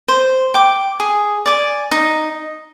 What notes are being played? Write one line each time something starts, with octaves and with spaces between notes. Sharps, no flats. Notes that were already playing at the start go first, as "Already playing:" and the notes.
C5
G5 D6
G#4
D5 G#5 D6
D#4